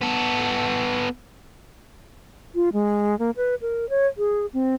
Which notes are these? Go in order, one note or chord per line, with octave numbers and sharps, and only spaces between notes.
B3 A4
F4
G#3
A#3
B4
A#4
C#5
G#4
C4